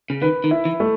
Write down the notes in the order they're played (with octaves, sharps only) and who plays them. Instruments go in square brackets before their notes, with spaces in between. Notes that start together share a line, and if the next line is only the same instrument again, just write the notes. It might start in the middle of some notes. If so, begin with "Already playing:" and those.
[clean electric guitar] C#3
[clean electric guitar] D#3 [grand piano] B4
[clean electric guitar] D#3
[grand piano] E4
[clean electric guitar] E3
[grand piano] A3